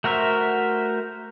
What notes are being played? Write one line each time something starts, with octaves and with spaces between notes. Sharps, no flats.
A3 F#4 A#4 C5 E5